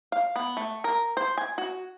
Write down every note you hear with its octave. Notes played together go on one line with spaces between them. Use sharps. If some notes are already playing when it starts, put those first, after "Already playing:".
F5
B3
A3
A#4
C5
G#5
F#4